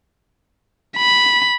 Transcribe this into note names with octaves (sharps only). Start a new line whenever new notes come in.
B5